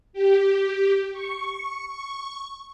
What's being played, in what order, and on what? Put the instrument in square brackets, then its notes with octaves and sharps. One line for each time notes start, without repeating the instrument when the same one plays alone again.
[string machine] G4
C#6
C#6